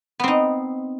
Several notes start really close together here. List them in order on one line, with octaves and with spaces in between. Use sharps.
B3 C4 D#4